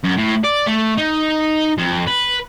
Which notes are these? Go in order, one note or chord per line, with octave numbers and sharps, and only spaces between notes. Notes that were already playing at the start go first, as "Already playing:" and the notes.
F#2
A2
D5
A3
D#4
F2
B4